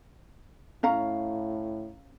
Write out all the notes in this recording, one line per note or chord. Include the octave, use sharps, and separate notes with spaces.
A2 C#4 F5 A#5